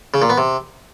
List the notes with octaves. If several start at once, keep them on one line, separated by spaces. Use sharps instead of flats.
C#3
A#2
B3
C3